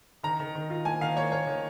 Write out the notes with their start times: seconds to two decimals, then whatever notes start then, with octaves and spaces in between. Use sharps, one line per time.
0.23 D#3 A#5
0.40 D#3
0.55 D#3
0.70 F4
0.85 A#3 G#5
1.01 D#3 F5
1.16 A#3 C#5
1.31 A#3 C#5
1.47 D#3